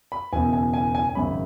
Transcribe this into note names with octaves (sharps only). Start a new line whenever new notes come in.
B5
F#1 E2 B2 G#5
G#5
G#5
G#5
G#5
G#1 F#2 C#3 B5